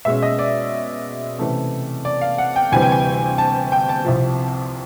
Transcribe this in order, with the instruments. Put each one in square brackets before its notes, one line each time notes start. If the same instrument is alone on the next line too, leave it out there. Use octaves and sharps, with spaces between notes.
[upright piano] B2 G#3 C#4 E5
D#5
D5
C3 E3 A3 C#4
D5
F5
F#5
G5
D2 C3 E3 G3 C4 G#5
G5
G#5
A5
G5
A5
C2 C3 F3